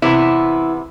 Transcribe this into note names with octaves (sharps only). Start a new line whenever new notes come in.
C3 E3 B3 E4